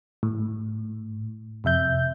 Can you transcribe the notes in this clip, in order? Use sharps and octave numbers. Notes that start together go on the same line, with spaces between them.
A2
F2 C3 E5 G6